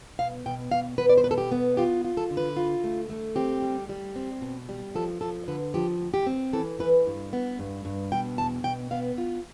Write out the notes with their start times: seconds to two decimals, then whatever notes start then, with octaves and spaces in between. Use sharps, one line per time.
0.19 B2 F5
0.46 B2 G5
0.72 B2 F5
0.98 B3 B4
1.09 D5
1.18 C5
1.24 B2 B4
1.31 A4
1.38 G4
1.52 B3
1.77 F4 G4
2.05 F4
2.17 A4
2.31 D3
2.37 B4
2.57 F4
2.84 A3
3.10 A3
3.36 C4 G4
3.62 G3
3.89 G3
4.16 C4
4.42 B2
4.69 G3
4.95 F3 A4
5.21 F3 A4
5.48 D3 B4
5.74 F3 G4
6.00 D2
6.14 G4
6.27 C4
6.53 E3 A4
6.79 E3 B4
7.07 G2
7.33 B3
7.59 G2
7.85 G2
8.12 B2 G5
8.38 E2 A5
8.64 B2 G5
8.91 B3 F5
9.18 F4